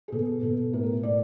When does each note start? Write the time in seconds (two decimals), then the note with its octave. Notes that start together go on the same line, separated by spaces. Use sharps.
0.08 G#4
0.12 B2 A4
0.43 B2 A4
0.73 A2 A#4
1.03 A2 D5